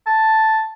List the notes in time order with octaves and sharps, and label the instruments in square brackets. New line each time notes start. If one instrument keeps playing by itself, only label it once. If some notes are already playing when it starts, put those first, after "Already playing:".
[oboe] A5